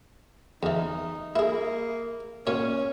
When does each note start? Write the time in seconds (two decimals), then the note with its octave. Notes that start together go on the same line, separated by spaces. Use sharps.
0.63 E2 E3 D#4
1.36 A#3 E4 G#4
2.47 A#2 C#4 C#5